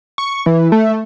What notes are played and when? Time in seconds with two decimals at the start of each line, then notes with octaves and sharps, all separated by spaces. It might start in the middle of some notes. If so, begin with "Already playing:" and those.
0.18 C#6
0.46 E3
0.72 A3